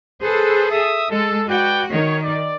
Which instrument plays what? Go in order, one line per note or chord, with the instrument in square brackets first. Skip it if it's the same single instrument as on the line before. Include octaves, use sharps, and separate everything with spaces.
[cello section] G#4 A4 [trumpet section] B4 C5
[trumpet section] E5 D#6
[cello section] G#3 [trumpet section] A4
[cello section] F#4 [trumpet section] B4 D5 G5
[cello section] D#3 [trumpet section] C#5
[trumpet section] D5